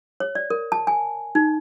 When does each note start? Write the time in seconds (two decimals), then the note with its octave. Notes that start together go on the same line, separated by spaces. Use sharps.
0.20 C#5
0.35 D5
0.50 A#4
0.72 A5
0.87 G#5
1.35 D#4